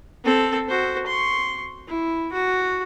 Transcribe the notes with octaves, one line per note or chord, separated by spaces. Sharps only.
C4 A4
F#4 C5
C6 C#6
E4
F#4